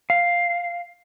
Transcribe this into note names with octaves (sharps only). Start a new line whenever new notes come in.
F5